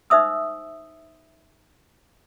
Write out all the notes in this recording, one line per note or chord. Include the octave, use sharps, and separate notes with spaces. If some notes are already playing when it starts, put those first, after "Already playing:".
D#4 C5 E5 D#6 E6